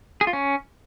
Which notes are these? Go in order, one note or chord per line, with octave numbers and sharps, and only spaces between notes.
G#4
F4
C#4